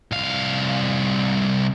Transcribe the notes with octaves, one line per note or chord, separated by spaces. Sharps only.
C2 F5